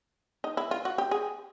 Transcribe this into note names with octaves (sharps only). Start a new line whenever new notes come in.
D#4
E4
F4
F#4
G4
G#4